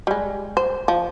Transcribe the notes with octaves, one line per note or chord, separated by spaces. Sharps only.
G3 G#3
C5
F3